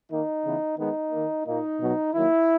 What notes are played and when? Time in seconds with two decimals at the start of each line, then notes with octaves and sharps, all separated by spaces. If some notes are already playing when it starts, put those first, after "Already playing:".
0.09 D#3 A#3 D#4
0.43 C#3 E3 B3
0.77 D#3 G#3 B3 D#4
1.11 D#3 A#3
1.45 A#2 A#3 D#4
1.79 B2 F#3 B3
2.13 D#3 F#3 A#3 E4